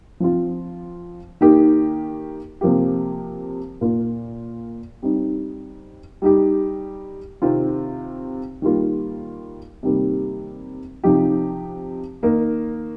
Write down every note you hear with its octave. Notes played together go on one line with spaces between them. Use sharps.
F3 C4 F4
D#3 A#3 D#4 G4
C3 F3 A#3 G4
A#2 A#3 F4
G3 C4 D#4
G3 D#4 G4
C3 D#3 C4 F4
D#3 G3 A#3 F4
C3 D#3 G3 A#3
C3 F3 D#4 G4
D#3 A#3 D#4